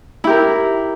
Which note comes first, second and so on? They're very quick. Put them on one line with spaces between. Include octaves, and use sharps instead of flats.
E4 G4 A#4